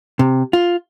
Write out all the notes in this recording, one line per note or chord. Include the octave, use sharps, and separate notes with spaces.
C3
F4